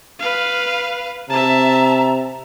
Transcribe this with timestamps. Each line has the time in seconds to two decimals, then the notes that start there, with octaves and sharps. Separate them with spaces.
0.19 B4 F5
1.30 C3 E5 A5 A#5